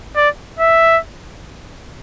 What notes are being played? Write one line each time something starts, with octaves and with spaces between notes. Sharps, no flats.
D5
E5